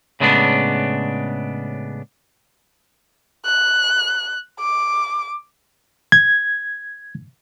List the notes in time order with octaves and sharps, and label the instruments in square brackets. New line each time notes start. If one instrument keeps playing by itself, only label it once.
[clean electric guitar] A2 C#3 G#3 B3 D4
[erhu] F#6
D6
[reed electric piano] G#6